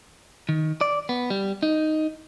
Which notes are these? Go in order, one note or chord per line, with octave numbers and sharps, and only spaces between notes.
D#3
D5
B3
G3
D#4